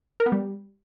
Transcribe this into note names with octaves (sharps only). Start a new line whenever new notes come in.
A#4
B3
G3